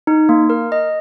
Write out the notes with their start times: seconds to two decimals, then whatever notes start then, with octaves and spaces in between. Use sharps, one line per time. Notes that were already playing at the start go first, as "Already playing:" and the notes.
0.07 D#4
0.29 A#3
0.50 A#4
0.72 D#5